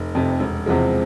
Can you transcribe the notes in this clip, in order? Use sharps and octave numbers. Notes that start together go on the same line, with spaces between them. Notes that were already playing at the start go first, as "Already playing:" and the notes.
Already playing: F1
F2 C3
E1
E2 C3 F3 G#3